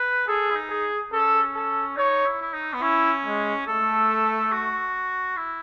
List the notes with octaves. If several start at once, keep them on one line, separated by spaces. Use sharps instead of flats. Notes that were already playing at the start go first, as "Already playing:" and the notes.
Already playing: B4
G#4 A4
E4
D#4
G#4
C#4 A4
A4
D#4 C#5
E4
E4
D#4
B3
C#4 E4
G#3
A3 A4
F#4
E4